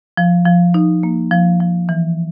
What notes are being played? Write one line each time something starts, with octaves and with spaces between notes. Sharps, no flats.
F3
F3
D#4
A#3
F3
F3
E3